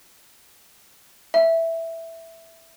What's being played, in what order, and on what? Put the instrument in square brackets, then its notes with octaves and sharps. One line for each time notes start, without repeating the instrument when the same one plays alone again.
[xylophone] E5